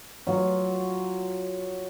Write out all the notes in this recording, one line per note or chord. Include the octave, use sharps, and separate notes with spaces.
F#3 F4